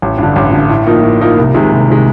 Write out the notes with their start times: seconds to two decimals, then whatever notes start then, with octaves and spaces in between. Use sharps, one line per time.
0.02 A1
0.18 G2 D3
0.36 A1
0.52 D3
0.57 G2
0.69 A2
0.86 F3 A#3 D#4
1.03 A2
1.21 F3 A#3 D#4
1.38 C2
1.54 C3 D#3 G#3
1.72 C2
1.88 C3 D#3 G#3